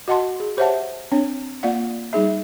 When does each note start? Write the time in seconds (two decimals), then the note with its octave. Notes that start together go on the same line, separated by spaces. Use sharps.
0.08 F#4 D#5 F#5 A5 C6
0.40 G#4
0.57 G4 C5 C#5 E5 F#5 A5
1.12 C4 D4 C#5
1.63 A#3 F4 D5 F5 F#5
2.13 G3 D#4 G#4 E5